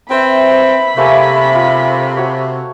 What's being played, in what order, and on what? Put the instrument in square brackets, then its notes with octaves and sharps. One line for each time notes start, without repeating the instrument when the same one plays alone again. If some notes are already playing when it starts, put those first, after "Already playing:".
[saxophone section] C4 [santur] B4 E5 [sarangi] B5
[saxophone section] C3 [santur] A3 A#3 G#5
[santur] F4
F#4 C#5